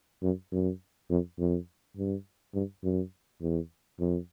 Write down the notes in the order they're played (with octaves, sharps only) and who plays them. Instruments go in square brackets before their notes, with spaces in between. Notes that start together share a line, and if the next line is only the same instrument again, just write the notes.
[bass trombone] F#2
F#2
F2
F2
G2
G2
F#2
E2
F2